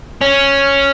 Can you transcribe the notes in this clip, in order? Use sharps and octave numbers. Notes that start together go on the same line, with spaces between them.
C#4